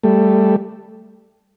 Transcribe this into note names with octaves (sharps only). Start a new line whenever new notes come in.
G3 A3